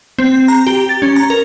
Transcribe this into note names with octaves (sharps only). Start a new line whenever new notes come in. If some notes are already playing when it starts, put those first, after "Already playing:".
C4
A#5
G4
A6
C#4
A#5
A#4